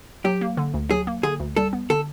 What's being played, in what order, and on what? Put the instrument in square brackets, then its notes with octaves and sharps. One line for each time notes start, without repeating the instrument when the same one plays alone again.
[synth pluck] F#3 [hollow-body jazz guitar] G4
[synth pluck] A#3
D3
D2
[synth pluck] F#3 [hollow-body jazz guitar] G#4
[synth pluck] A#3
[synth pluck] D3 [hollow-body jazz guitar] G#4
[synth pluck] D2
[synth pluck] G3 [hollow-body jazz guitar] A4
[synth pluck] B3
[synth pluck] D3 [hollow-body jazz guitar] A4